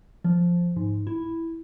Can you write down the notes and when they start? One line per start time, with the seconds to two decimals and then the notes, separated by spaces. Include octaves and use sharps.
0.25 F3
0.76 G#2
1.07 E4